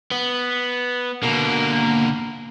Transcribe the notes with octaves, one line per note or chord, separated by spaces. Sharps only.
B3
B2 D3 A#3 A#4